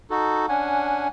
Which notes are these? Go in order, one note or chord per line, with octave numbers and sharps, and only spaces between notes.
D#4 F#4 A4
C#4 D4 F#5 G#5